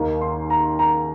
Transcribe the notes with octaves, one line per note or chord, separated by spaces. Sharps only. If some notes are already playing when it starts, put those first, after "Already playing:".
Already playing: D#2 D#3 A#3 D#4
C6
A#5
A#5